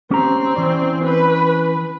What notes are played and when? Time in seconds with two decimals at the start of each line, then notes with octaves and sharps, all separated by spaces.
0.11 C4 C#4 G4 A#5
0.56 E3 C#4 D5
1.04 B4